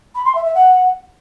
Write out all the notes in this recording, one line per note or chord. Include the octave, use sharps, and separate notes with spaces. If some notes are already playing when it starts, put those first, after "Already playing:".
B5
C6
E5
E5
F#5